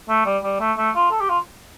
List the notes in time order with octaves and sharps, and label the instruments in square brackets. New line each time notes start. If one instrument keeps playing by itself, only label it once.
[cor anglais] A3
G3
G3
A3
A3
F4
A4
G4
F4